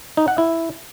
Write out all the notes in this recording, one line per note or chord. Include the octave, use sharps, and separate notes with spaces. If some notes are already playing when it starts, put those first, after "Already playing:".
D#4
F#5
E4